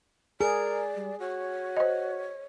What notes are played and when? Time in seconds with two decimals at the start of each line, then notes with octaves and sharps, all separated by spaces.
0.41 G#4 A#4 D5
0.96 G3
1.20 F#4 C#5
1.77 C5 D#5